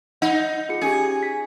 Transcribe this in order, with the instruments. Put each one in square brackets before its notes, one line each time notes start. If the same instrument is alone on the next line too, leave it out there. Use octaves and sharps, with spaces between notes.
[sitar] D#4 [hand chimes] F#5
[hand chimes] F4 G#4 C#7
[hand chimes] C#4 G4 [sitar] G#4
[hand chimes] B6